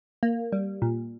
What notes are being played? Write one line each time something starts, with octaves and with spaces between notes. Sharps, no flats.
A#3
G3
A#2